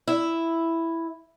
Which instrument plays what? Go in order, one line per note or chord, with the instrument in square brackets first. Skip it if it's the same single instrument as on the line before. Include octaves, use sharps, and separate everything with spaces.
[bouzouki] E4